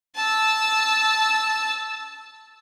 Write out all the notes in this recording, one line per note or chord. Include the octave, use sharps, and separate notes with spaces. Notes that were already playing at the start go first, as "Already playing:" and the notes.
A5 E6